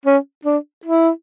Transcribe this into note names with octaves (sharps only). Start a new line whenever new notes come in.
C#4
D4
E4